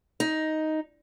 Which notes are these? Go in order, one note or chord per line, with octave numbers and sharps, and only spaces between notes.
D#4